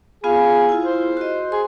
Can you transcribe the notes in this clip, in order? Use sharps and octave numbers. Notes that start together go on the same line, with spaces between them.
B3 F4 G#4 F5
E4 F4
C5
F#4 D#5
G#4 C6